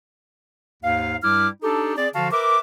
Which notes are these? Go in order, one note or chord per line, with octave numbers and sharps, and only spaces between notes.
D#2 G#2 F5
G2 G3 E4 D6 F6
D4 D#4 G4 A4
C4 G#4 D5
D3 F3 F#4 F5 A5
A#4 B4 E5 D6